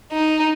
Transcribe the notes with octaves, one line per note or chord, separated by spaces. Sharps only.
D#4